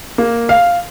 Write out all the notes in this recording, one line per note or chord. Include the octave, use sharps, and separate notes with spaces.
A#3
F5